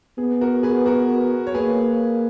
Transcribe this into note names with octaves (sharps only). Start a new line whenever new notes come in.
B3 G#4
F#4 A#4
G#4 B4
F#4 A#4
C#5
A#3 G#4 B4